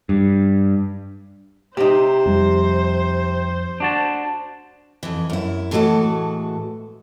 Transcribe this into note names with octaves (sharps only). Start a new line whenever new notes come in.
G2
C3 D#4 G4 C5
F2 G3
D4 F#4 A5
F2 E3
F#2 E4
A2 E3 G#3 A3 F#4 A4